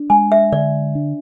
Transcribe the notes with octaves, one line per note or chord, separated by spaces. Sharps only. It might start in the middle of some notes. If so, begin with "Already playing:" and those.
Already playing: D4
G#3 G#5
E5
D3 D5
D4